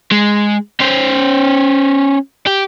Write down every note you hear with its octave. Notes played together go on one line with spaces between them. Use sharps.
G#3
C#4 C5
G4